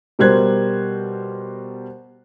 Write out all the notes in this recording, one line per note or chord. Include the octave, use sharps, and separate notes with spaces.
B2 G3 A#4 C5 F#6 G#6